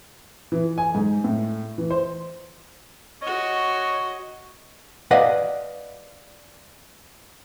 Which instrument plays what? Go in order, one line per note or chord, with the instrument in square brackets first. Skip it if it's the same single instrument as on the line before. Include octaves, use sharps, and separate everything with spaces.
[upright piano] E3
G#5
G#2
A2
E3
C5
[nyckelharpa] F#4 D#5 [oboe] C#5
[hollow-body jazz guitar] B4 D5 D#5 F5 F#5